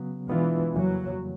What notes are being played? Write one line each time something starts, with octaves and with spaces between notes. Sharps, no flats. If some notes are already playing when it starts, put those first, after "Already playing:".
Already playing: C#3 F#3 B3
B2 E3 G#3 B3 D4 F4
F2 C#3 E3 F#3 G3 A#3